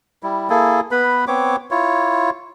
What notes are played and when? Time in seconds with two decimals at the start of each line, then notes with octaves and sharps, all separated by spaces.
0.23 G3 E4
0.50 A#3 E4 G#4 A4
0.91 B3 B4 B5
1.28 B3 C4 C#5 D6
1.71 E4 F4 C#5